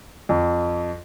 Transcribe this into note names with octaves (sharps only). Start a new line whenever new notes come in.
F2